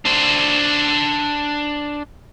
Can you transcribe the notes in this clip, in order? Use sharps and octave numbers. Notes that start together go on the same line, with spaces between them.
D4 C5